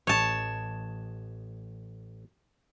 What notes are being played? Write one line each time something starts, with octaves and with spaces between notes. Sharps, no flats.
A1 C#5 D#5 A5